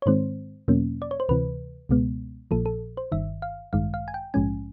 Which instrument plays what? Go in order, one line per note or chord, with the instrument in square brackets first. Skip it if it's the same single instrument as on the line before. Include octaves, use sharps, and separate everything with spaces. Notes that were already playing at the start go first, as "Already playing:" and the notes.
[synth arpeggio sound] C#5
G#2 D#3 G#3 C4 C5
E2 B2 F#3 A#3 C#4
D5
C#5
C5
D2 C3 E3 B4
C#2 B2 G#3 B3
A#1 A#2 F3 A4
A4
C5
G1 G2 D#3 E5
F5
A1 G2 D#3 G#3 F5
F5
G#5
G5
A#1 G#2 F3 G#3 C#4 G#5